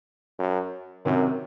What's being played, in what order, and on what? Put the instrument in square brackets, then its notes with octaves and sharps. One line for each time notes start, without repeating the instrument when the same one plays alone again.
[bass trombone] F#2
[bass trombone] F#2 [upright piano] C3 D#3